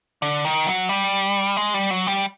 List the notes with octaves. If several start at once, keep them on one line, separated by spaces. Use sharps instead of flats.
D3
D#3
F#3
G3
G#3
G3
F#3
G3